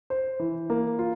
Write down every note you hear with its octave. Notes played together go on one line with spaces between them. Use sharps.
C5
E3
A#3
F4